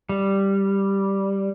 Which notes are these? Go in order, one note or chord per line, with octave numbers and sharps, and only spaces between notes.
G3